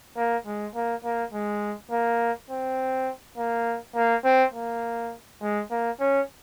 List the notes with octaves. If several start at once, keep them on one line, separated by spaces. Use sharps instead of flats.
A#3
G#3
A#3
A#3
G#3
A#3
C4
A#3
A#3
C4
A#3
G#3
A#3
C#4